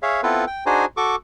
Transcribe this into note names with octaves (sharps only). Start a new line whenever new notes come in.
G#4 C#5 E5 F5
B3 C4 E4 F4 A4 B4
G5
D4 D#4 F#4 G#4 C5 G#5
F#4 A4 C#6 D6